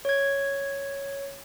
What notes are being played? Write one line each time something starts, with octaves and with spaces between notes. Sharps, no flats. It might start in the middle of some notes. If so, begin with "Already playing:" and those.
C#5 G#6